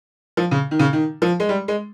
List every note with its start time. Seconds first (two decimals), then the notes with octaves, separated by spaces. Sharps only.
0.37 F3
0.51 C#3
0.71 D#3
0.79 C#3
0.93 D#3
1.22 F3
1.40 G#3
1.49 G3
1.68 G#3